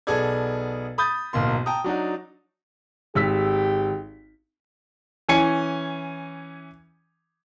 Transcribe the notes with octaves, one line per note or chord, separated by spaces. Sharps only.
B1 B3 G#4 A4 D5 G#6
B5 D#6 G6 A6
D1 B1 A#3 C6
G5 A5 A#5 D#6
F#3 D4 D#4 F#4
G#1 G4 E6 B6
E3 C#4 G#5 C#7